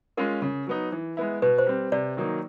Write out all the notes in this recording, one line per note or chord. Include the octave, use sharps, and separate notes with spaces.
G#3 C#4 F4 A#4
C#3
F#3 B3 D#4
E3
G#3 B3 E4
B2 B4
C5
G3 C4
C3 D5
D#3 F#3 A#3 D#4